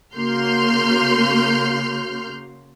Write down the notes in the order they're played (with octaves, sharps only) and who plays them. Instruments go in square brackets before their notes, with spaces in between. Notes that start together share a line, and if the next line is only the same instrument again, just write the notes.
[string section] C#3 A#3 F#4 C6 F6 G6